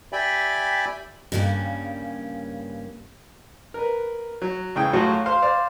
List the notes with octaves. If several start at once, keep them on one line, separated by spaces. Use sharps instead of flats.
G4 D5 E5 G5 G#5 B5
G2 C#3 G3 A#3 C#4
A#4 B4
F#3
C#3 E3 G#3 G5 D#6
A2 F#3 F4 F#4
C5 F5 C6
C5 D5 F5